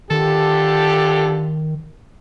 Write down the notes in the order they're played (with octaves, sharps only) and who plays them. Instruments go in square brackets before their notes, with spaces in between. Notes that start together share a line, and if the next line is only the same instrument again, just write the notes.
[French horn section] D3 F4 G4 [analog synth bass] D#3 [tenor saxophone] A4